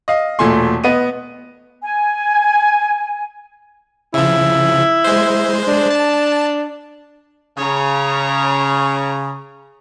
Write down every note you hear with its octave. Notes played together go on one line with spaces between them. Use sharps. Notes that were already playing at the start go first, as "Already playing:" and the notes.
D#5 F5
E1 A#2 A3 G#5 C6
B3 B4 D#5 D#7
G#5
C#3 F3 E4
G#3 C5
D4
A5
C#3 C#5 A#5